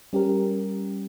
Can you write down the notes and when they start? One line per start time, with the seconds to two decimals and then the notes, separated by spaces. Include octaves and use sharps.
0.13 G3 C#4 G4 A#4